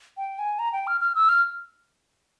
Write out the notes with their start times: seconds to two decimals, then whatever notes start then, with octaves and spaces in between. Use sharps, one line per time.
0.17 G5
0.38 G#5
0.59 A#5
0.73 G5
0.87 F6
1.00 F6
1.15 E6
1.29 F6